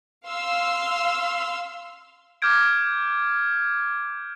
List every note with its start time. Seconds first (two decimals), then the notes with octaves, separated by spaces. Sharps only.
0.24 F5 C6 E6
2.42 D6 F6 G6 G#6 D7